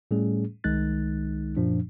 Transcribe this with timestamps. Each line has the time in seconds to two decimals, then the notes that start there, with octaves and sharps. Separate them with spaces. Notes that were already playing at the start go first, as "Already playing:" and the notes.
0.11 A2 G3 A3 C#4 G#4
0.64 C2 D#3 G#3 D#4 F#6 A6
1.57 F#2 A#2 F3 D4